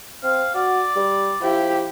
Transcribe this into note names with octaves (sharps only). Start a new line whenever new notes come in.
C4 F5
F#4 D5
G3
F3 E4 G4